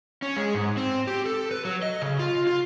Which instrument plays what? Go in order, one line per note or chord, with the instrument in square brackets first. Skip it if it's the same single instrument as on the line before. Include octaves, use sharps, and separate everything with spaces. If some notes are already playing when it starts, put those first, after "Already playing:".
[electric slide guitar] C#4
G#3
G#2
C4
G4
A4
B4
F#3
D#5
C#3
F4
F4